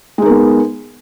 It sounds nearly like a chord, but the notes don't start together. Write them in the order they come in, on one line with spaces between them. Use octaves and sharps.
G#3 D#4 A#4 B3